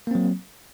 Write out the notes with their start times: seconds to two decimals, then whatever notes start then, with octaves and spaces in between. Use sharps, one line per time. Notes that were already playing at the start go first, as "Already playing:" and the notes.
0.07 A#3
0.11 C4
0.15 F#3